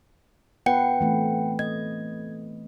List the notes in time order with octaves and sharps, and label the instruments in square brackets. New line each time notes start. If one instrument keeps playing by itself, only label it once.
[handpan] B3 F4 B4 [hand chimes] F#5 G5 C#7
[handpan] E3 A3 C4
[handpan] D#5 [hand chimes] G#6